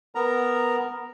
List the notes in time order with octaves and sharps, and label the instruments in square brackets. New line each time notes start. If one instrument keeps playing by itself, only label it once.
[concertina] B3 A#4 A#5